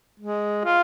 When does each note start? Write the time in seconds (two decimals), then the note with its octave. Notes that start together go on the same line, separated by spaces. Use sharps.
0.20 G#3
0.64 F4